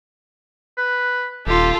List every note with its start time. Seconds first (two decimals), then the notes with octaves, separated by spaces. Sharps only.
0.77 B4
1.47 D#1 F4 G4 A4